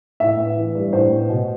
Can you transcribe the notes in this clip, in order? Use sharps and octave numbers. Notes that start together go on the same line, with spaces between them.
A2 E5
B3
E3
G2
A2 C5
B3
B2